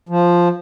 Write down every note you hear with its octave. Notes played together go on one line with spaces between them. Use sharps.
F3